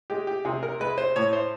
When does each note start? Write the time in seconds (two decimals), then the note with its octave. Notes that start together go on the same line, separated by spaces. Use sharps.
0.10 G#3 G4
0.27 G4
0.45 C3 G#4
0.63 A#4
0.80 G#3 B4
0.98 C5
1.16 A2 C#5
1.33 C5